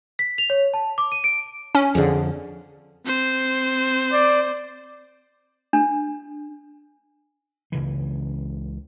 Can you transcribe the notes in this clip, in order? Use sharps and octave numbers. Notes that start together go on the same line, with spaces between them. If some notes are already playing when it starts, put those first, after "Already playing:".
B6
F7
C#5
A5
D6
D#7
D7
C#4
F2 D3 G#4
C4 C5
D5
D4
C#2 C#3 E3